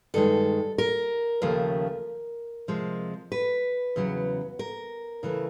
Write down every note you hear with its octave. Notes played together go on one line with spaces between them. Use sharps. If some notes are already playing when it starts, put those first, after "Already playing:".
G2 D#3 G#3 A4
A#4
D#2 C#3 F3 A3
C3 F3 G#3
B4
E2 C#3 F#3
A#4
C#3 E3 A3